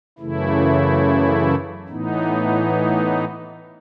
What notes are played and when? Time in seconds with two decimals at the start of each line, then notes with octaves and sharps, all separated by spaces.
0.19 F#2 C#3 E3 A3 E4
1.88 A2 E3 B3 D#4